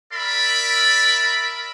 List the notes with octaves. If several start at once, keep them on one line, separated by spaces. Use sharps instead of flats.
A#4 D5 E5 B5